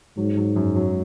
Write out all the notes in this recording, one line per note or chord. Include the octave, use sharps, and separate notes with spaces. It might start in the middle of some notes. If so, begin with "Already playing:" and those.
G#2 F#3
F#3
F#2
F#3